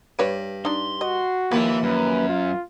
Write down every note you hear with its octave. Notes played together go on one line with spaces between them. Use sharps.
G2 B4 C#5 D5
D4 D#4 C6
F#4 D#5
D#2 F3 A#3 B4 E5
F#2 B4
F4